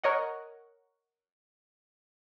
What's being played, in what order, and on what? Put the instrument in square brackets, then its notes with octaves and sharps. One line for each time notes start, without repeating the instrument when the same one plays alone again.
[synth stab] A#4 C#5 D#5 F#5